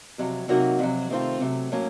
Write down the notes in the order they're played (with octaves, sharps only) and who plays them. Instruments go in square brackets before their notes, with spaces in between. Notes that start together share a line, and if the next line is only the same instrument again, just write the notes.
[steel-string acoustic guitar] F2 C3 F#3
C3 F#3 A#3 D#4 F#4
F2 C3 F#3
C3 D#3 A3 C4 F4
C3 F#3 A3
A2 F#3 A#3 C#4